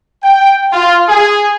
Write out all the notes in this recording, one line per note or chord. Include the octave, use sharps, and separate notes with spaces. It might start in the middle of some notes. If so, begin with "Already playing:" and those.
G5
F4
G#4